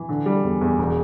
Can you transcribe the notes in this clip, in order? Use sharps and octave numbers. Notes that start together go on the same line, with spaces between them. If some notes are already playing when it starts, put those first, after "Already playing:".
Already playing: E3
D3
G3
E2
E2
E1